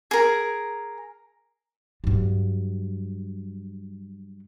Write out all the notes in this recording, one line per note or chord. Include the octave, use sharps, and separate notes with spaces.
G#4 A#4
G2 F#3